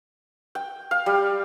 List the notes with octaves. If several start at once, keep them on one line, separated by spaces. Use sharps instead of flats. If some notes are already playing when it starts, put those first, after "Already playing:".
G5
F5
G3